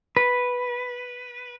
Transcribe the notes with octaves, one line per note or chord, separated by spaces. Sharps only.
B4